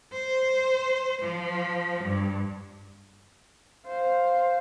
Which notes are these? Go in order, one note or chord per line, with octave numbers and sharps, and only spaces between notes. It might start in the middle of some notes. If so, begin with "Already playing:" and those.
C5
F3
G2
C5 F5